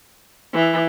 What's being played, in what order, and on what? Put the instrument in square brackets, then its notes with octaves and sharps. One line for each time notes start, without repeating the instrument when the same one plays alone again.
[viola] E3